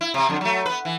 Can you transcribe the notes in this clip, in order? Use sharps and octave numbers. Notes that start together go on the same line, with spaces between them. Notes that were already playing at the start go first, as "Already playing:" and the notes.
E4
C3 C4
F2 D3
F#3 A3
B3 B4
E3